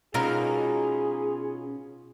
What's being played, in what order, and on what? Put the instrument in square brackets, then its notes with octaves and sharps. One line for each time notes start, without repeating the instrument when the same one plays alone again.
[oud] B2 D#4 A#4 [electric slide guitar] C#4 F4 [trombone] G#4